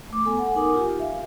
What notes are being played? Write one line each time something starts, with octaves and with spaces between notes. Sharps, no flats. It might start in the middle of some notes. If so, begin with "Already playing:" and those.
A3 D6
B3 A4 G#5
F#5 G#5
D#4 A#4 G#5 D6
F4 G4
E5 F5